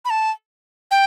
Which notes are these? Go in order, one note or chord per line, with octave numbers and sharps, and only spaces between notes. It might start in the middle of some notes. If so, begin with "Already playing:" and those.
B5
A5
G5